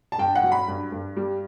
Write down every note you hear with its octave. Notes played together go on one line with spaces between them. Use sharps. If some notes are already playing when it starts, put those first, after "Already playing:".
A5
G2 G5
F#5
F#3
B5
G2
G2
G3